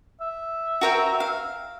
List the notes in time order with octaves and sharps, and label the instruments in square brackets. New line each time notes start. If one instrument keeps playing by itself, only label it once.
[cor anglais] E5
[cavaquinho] F#4 A#4 G5
F5